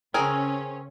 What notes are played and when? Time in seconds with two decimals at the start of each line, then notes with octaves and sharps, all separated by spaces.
0.14 C#3 C4 C#4 G#4 A#4